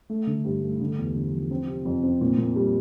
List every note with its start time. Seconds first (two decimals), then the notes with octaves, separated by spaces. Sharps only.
0.10 A3
0.27 D3
0.45 G2
0.62 A3
0.81 D3
0.99 E2
1.16 D3
1.33 F3
1.51 C4
1.68 C3
1.85 F2
2.03 C4
2.21 A#2
2.38 A#2
2.56 G3